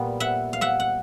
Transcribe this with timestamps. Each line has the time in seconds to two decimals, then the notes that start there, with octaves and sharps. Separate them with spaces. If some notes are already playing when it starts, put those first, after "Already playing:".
Already playing: A#2 G3 B3
0.20 E5 F#5
0.53 F5
0.61 E5 F#5
0.80 F#5